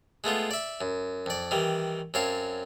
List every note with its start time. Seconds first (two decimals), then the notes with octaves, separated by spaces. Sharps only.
0.24 G#3 A3 B3 F4
0.51 D5 E5
0.81 F#2
1.26 F2 D5
1.51 D#3 E3 G3
2.14 F#2 C4 C#5 F5 A5